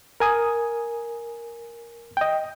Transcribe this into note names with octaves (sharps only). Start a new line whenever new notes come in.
A#4 G#5 D#6
D#5 G5